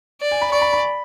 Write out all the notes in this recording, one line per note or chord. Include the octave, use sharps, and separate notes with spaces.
D5
G#5
B5
D5 C#6
B5
B5